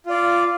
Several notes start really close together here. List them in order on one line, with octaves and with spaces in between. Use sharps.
F4 D5 F5